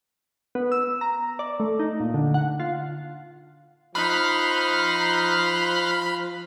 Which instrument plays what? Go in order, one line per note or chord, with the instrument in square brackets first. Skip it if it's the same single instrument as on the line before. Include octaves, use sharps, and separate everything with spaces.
[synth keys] B3
E6
A#5
D5
A3
D#4
A#2
D3
F#5
F4
[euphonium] F3 [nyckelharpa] D#4 [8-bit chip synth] B5 [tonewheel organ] C6 F6 F#6